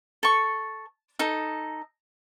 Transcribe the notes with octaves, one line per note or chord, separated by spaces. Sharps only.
A4 C#6
D#4 A4